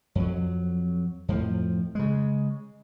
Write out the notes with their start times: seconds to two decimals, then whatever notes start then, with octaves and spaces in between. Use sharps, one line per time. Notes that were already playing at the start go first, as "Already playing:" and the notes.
0.15 F2 F#3
1.28 F2 A2 F3
1.95 C#3 G#3